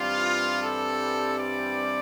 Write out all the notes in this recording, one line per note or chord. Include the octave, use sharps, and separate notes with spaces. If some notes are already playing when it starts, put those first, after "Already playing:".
Already playing: G2 E3 G3 C4 F4
A4
D5